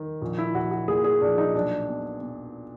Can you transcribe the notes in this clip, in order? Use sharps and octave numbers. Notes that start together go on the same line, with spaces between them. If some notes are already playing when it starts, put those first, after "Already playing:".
Already playing: D#3
A#1
E4
A#1 F#4
F#4
A#2 G#4
G#4
A#1 D4
D#4
B1 D4
B2
B2